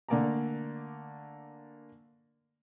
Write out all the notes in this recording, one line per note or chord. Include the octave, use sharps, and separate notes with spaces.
D3 A3 A#3 D5 G#5 A#5